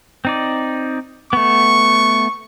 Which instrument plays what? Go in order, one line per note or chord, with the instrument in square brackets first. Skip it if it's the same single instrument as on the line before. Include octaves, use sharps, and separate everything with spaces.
[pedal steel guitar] C4 D#4 D5
[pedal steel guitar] A3 B3 [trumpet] C#6